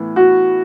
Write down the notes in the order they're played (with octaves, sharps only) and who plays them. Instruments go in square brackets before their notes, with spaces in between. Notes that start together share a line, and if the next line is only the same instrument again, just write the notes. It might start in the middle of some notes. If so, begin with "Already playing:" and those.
Already playing: [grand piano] A2 E3 B3
[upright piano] F#4